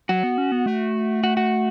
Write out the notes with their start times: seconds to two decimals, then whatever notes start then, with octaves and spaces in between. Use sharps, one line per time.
0.09 F#3 F#4
0.23 B3
0.38 C#4
0.52 B3
0.66 A3
1.24 F#4
1.37 F#4